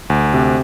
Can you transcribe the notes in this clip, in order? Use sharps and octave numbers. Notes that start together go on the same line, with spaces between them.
D2
C3